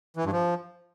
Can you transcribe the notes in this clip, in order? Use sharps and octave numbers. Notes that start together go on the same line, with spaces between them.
E3
G2
F3